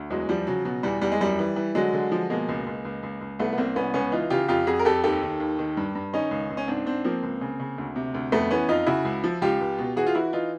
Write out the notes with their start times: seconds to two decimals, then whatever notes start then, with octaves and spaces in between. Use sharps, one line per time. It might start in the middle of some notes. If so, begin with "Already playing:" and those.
Already playing: D2
0.10 E2 F#3 G#3
0.29 F3 G3
0.47 C#3 F#3
0.65 B2 F#3
0.83 E2 G3
1.01 E2 G3
1.12 G#3
1.21 F#2 G3
1.39 E3
1.56 E3
1.75 D3 F#3 G#3
1.93 D3
2.12 F3
2.30 B2 G#3 A#3
2.48 C#2
2.66 C#2
2.85 C#2
3.03 C#2
3.21 C#2
3.39 C2 A3 B3
3.53 B3
3.58 C2 A#3 C4
3.76 C2 B3 C#4
3.94 C#2 B3 C#4
4.12 E3 D#4 F4
4.30 C#3 F4 G4
4.48 F2 F4 G4
4.67 F2 F#4 G#4
4.79 A#4
4.85 F2 G4 A4
5.04 D#2 G4 A4
5.22 D#3
5.40 D#2
5.59 D#3
5.77 G2
5.95 G2
6.13 D#3 C#4 D#4
6.31 C#2
6.50 C#2
6.57 C#4
6.68 G#2 C4 D4
6.86 G#2 C4 D4
7.04 F3 A#3 C4
7.23 C#2
7.41 C#3
7.60 C#3
7.78 D2
7.96 C3
8.14 D2
8.32 F2 A3 B3
8.51 E3 B3 C#4
8.68 F2 D#4 F4
8.87 C#3 E4 F#4
9.05 C#2
9.24 F3
9.42 C#2 F4 G4
9.61 C#2
9.78 B2
9.96 E3 F#4 G#4
10.07 F4
10.15 E3 E4 F#4
10.33 E3 D#4 F4